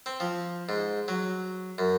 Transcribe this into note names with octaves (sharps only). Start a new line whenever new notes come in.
C4
F3
G#2
F#3
F#2